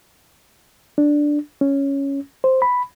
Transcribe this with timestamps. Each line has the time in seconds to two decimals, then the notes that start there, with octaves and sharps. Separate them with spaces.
0.98 D4
1.61 C#4
2.44 C5
2.62 B5